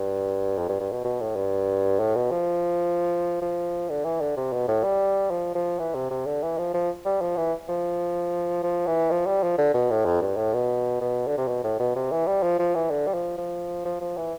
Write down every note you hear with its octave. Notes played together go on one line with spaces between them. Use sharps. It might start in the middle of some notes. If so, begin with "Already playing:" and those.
Already playing: G2
F2
G2
G2
B2
B2
A2
G2
A2
B2
F3
F3
D3
E3
D3
C3
B2
A2
G3
F3
F3
E3
C3
C3
D3
E3
F3
F3
G3
F3
E3
F3
F3
E3
F3
G3
F3
D3
B2
A2
F2
G2
A2
B2
B2
D3
C3
B2
A2
B2
C3
E3
G3
F3
F3
E3
D3
G3
F3
F3
F3
F3
E3